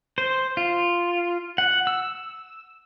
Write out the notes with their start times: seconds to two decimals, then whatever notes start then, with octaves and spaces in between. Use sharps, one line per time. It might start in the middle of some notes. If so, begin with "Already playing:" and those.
0.18 C5
0.57 F4
1.58 F#5
1.87 E6